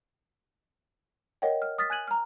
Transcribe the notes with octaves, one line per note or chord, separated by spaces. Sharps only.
A#4 C#5 D#5 F#5 G5
F6
D#6 F6 A6 B6
G#5 F#6 G#6 D#7 F#7
A#5 F6